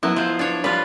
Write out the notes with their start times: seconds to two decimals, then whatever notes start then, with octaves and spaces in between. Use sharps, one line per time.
0.03 F#3 B3 E4 D#5
0.16 F3 C5
0.39 D4 C#5
0.64 G3 F4 B4